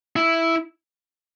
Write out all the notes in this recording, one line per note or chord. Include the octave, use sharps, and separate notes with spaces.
E4